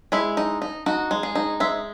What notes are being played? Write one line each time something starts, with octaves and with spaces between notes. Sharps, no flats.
G#3 E4
D#4
D#4
D#4 F#4
G#3
G#4
D#4
G#3 E5